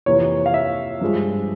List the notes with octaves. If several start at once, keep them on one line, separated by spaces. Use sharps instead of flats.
F2 C3 E3 A#3 C#5
F5
E5
G2 F3 G#3